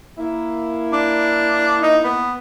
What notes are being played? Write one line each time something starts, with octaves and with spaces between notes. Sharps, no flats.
A#3 E4
D4
D#4
B3